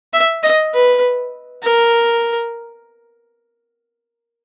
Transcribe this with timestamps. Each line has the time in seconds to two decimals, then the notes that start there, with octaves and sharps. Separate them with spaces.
0.13 E5
0.43 D#5
0.73 B4
1.63 A#4